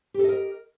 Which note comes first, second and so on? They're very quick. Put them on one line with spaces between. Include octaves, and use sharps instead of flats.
G4 A4 D#5 A#4